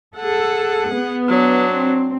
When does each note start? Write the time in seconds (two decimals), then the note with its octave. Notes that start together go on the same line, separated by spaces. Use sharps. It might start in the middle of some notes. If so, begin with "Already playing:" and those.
0.17 G#4 A4 F#5
0.92 B3
1.29 F#3 D4
1.74 C4